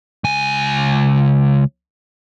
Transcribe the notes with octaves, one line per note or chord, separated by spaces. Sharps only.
C#2 G#5